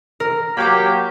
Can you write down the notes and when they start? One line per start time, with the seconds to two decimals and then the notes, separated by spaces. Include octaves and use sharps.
0.20 A#4
0.57 F#3 A#3 G4 B5 D6